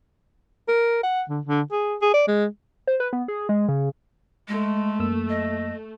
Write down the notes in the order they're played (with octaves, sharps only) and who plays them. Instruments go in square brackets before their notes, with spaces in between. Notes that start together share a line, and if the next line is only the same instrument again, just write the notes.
[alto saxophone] A#4
F#5
D3
D3
G#4
G#4
D5
G#3
[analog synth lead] C5
B4
B3
G#4
G#3
C#3
[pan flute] G#3 [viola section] A3
[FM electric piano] F#2 A#3 E6
[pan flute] D#5